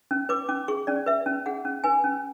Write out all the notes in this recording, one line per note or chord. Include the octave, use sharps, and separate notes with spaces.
C#4
B4 D6
C#4 D6
G#4 C#6
C#4 D5
B4 E5
C#4
G#4 F#5
C#4
B4 G#5
C#4